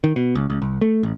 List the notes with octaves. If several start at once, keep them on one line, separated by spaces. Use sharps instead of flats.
D#3
B2
C#2
C#2
C2
A3
A1